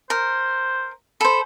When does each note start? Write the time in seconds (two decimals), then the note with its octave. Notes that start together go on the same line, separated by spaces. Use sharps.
0.10 A#4 C5
1.21 A4 C5 B5